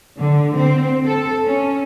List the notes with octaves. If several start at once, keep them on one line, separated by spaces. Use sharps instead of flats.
D3
C4
A4
C#4